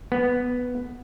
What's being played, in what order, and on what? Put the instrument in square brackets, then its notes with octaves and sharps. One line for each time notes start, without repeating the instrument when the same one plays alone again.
[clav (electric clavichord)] B3